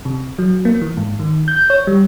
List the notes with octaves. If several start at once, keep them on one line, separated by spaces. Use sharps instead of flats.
C3
F#3
A#3
E3
G#2
D#3
G6
C#5
G3